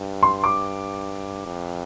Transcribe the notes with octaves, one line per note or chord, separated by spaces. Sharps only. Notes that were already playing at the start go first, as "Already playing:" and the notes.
Already playing: G2
C6
D6
F2